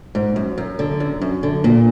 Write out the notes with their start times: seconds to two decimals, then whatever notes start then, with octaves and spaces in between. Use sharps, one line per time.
0.15 G#2
0.36 F#2
0.58 F#2
0.79 D3
1.00 F#2
1.21 F#2
1.43 D3
1.64 A#2